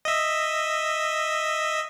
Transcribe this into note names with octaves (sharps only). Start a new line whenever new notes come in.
D#5 E5